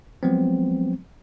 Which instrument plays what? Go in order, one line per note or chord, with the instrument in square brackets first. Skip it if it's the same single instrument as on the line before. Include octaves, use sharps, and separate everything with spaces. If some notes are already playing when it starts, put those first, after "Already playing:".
[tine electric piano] F3 F#3 G#3 B3 C4